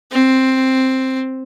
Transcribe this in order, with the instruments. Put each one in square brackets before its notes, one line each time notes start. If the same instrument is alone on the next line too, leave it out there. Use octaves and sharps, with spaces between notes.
[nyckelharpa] C4